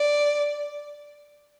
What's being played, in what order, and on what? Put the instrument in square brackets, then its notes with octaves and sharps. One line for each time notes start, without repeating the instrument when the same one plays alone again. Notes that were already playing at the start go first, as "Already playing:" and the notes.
Already playing: [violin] D5